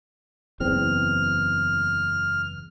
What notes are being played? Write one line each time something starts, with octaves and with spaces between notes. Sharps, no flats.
F#1 E2 C4 F6